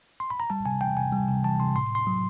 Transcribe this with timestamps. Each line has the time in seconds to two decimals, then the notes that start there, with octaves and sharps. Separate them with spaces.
0.20 C6
0.30 B5
0.40 A#5
0.50 G3 A5
0.66 C3 G#5
0.81 E3 G5
0.97 C3 G#5
1.12 G3
1.29 C3
1.44 E3 A5
1.60 C3 C6
1.76 A2 C6
1.92 A2 C6
2.07 F#3